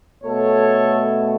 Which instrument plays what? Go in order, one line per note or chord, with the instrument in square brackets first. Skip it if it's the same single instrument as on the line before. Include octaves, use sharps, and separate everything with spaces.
[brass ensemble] B2 A3 A4 C#5